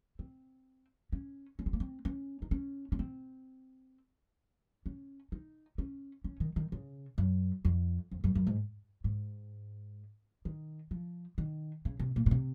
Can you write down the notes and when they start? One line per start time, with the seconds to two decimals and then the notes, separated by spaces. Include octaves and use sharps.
0.19 C4
1.12 C#4
1.59 C#4
1.66 C4
1.73 A#3
1.80 C4
2.05 C#4
2.42 D#4
2.51 C#4
2.92 C#4
2.99 C4
4.86 C#4
5.32 D#4
5.78 C#4
6.24 C#4
6.40 D#3
6.56 D#3
6.72 C#3
7.18 F#2
7.65 F2
8.11 F2
8.24 F#2
8.35 F#2
8.47 G#2
9.04 G#2
10.45 D#3
10.91 F3
11.38 D#3
11.85 C#3
12.00 C3
12.16 A#2
12.26 A#2
12.31 C3